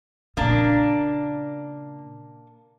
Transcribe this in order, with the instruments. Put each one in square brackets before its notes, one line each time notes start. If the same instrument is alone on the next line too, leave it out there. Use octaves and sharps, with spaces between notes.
[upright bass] A#2 C#3 [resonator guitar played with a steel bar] A#3 D4